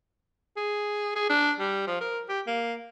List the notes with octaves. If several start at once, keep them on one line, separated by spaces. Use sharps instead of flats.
G#4
G#4
D4
G3
F3
A#4
G4
A#3